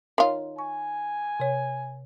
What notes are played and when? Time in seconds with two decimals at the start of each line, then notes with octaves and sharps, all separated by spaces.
0.18 D#3 F4 C#5 C6
0.59 G#5 C#6
1.40 C3 C#5